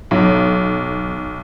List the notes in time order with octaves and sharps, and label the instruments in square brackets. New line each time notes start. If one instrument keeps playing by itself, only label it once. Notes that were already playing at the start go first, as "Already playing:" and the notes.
[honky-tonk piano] B1